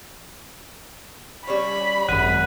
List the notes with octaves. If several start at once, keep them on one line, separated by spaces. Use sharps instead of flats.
G3 C#4 C#5 B5
G#1 F#2 F#5 F#6 B6 D#7